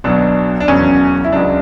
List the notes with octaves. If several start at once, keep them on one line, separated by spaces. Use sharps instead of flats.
B1 B2 F#3 D4
D4
E1 E2 C#3 F#3 C#4
E4
C#2 C#3 F#3 D4